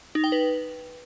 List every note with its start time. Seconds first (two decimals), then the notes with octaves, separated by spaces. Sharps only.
0.15 D#4
0.24 G5
0.32 B4